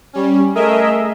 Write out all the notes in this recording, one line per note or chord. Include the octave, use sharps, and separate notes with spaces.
G3 C#4
A3 G#4 A#4 D#5 E5